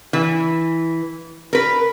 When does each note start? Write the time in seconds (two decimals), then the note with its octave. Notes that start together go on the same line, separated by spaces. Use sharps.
0.13 E3
1.53 A#4 B4